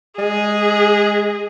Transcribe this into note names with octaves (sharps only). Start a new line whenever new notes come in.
G#3 G#4